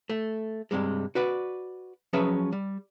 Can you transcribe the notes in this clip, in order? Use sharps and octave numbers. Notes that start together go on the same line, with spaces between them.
A3
G2 C3 G3 G#3
F#4 B4 D5
F3 F#3 C#4 G#4 B4 E5
G3